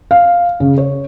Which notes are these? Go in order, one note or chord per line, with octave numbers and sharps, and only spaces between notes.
F5
C#3
C#5